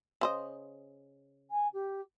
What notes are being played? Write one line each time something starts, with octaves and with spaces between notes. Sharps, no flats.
C#3 C5 D#5
G#5
G4